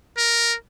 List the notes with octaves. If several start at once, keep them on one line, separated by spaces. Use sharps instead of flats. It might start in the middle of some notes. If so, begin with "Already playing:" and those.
A#4